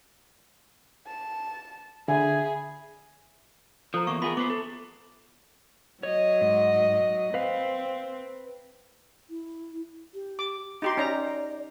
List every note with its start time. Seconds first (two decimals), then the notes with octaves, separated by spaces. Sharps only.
1.07 A5
2.08 D3 G#4 E5 G#5 B5
3.94 F3 A4 C5 A#5
4.07 E2 A#3 C#6
4.22 B3 F4 G#4 A#4 E5 B5
4.37 B3 B4 C5 D6
4.50 A4
6.03 F#3 C#5 D#5
6.41 G#2
7.34 C4 B4 F5
9.30 E4
10.14 G4
10.39 D6
10.82 D#4 F#4 G4 C6
10.97 C#4 D#4 D5 A#5